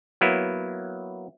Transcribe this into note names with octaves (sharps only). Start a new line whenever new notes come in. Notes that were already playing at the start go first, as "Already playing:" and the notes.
F#3 A#3 B3 E4